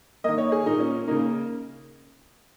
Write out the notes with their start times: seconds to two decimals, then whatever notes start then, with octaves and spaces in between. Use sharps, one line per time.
0.24 D#3 A#3 D#5
0.38 C#5
0.52 G#4
0.66 A#2 A#3 D#4
0.80 C#4
1.07 C#3 A#3 D#4